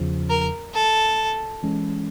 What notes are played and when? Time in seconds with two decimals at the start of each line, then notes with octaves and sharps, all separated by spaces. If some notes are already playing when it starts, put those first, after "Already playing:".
Already playing: E2 C#3 F3
0.30 A#4
0.75 A4
1.63 E3 G#3 C#4